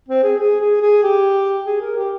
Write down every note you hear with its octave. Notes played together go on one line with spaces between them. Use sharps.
C4
G#4
G#4
G#4
G#4
G4
G#4
A#4
G4